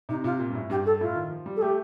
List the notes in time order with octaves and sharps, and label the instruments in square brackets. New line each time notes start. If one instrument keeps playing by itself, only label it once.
[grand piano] C3 [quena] D#4
[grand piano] C3 [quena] F4
[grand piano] A#2
G2
A2
[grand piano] G2 [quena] G4
[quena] A4
[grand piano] A2 [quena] F4
[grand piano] D#3
F3
G3
[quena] A4
[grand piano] A3 [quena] G4